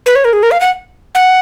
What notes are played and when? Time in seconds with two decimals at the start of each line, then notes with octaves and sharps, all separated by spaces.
0.06 B4
0.16 C#5
0.25 A#4
0.33 G#4
0.43 A#4
0.51 F5
0.61 F#5
1.15 F#5